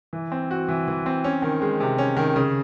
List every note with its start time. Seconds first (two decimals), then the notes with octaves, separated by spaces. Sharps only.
0.13 E3
0.32 C4
0.51 F#4
0.69 E3
0.88 E3
1.06 C4
1.24 C#4
1.42 D#3
1.62 G#3
1.80 C3
1.98 C#4
2.16 D#3
2.36 C#3